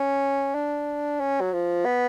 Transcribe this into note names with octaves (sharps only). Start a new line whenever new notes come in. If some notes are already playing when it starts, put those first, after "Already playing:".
Already playing: C#4
D4
C#4
F#3
F3
B3